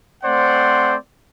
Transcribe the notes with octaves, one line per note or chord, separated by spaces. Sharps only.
A3 C4 C5 D5 F#5